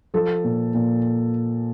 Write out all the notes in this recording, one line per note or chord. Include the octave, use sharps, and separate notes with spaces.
F3 A4
A#2
A#2